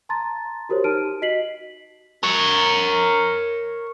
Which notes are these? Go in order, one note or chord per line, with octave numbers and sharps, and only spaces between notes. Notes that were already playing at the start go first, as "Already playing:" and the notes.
A5 A#5 C6 A6
F#4 G4 A#4 C5 C#5
D#4 G4 A5 F6 D7 D#7
F#4 D#5 B6 C7 F#7
A#4 C#5